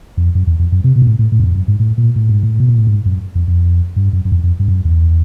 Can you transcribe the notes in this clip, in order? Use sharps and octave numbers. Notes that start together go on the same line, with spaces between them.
F2
F#2
E2
F2
F#2
C3
B2
A#2
A2
A2
A2
F#2
F2
F#2
G#2
A2
A#2
A2
G#2
A2
B2
A#2
A2
G#2
F#2
F2
F2
G2
F#2
F#2
F2
F2
G2
F#2
E2